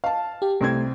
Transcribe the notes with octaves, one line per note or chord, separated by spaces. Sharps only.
F5 A5
G4
C2 A3 C4 G#6